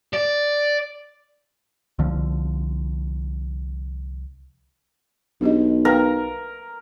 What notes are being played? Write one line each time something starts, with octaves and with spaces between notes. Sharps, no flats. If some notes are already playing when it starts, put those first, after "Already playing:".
D5
C2 D3 F3
B1 D4 G4 D#5
A#4 B4 F5 G5